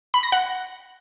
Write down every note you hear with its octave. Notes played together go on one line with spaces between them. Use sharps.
B5
A#6
F#5